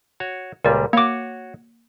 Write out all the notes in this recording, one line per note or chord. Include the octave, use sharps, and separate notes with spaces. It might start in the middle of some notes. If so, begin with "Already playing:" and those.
F#4 C#5
C#2 A#2 G3 A#4 D5
A#3 F#4 C#5 D6